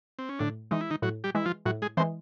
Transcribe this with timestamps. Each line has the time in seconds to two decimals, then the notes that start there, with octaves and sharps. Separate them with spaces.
0.19 C4
0.29 C#4
0.39 A2 D3 D4
0.71 E3 G#3 D#4
0.81 E4
0.91 D#3 D#4
1.02 A2 F#3 F#4
1.24 G3 G4
1.35 E3 G#3 E4
1.46 F3 F4
1.66 A2 F#3 F#4
1.82 G#3 G#4
1.97 E3 G#3 C4 C5